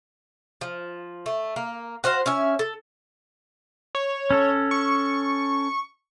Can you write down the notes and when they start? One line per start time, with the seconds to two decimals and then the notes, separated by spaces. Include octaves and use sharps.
0.61 F3
1.26 A3
1.56 A#3
2.04 F#4 C5 F5 F#5
2.26 C#4 E5 G#5
2.59 A4
3.95 C#5
4.31 C#4 A4
4.71 C#6